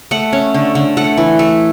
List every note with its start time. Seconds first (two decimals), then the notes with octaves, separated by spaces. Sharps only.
0.11 A3 F#5
0.33 C#4
0.54 D3
0.75 D3
0.97 A3 F#5
1.17 E3
1.39 A3